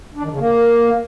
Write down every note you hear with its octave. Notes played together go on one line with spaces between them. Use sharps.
D4
D#3
C#3
A#3